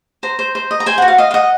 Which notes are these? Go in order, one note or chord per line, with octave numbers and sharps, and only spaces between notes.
C5 A#5
C5
C5
D#5
A#5
C5 G#5
F#4 F#5
F5
D#5 F5
F5
D#5 F#5